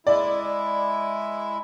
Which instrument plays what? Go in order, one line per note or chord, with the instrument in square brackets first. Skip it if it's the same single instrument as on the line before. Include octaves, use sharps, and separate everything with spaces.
[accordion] G#3 E4 [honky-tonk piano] D5